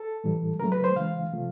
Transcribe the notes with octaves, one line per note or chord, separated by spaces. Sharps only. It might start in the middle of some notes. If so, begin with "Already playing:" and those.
Already playing: A4
A2 E3 G3
C#3 F#3 A3 A#4
B4
C5
C#3 E3 G#3 F5
C3 F3 A3